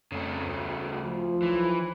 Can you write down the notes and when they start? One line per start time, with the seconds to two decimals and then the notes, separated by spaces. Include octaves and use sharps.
0.12 F2 C#3 A3
0.47 D2
1.04 F3
1.42 B1 E3